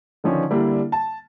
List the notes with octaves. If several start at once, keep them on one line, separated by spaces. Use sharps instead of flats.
D3 D#3 F3 C#4 D4
D3 G3 A#3 D4 E4
A5